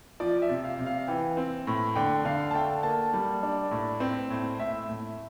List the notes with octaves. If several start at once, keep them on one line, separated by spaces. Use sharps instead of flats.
F3 D5
E5
C3
F5
C3
F5
E3 G5
C4
A2
D3 G5
D3 F5
A5
A3 G5
A#3 A5
G3
D4
A2
C4
A2
A2 E5
A2